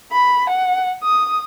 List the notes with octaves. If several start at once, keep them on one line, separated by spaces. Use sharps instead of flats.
B5
F#5
D#6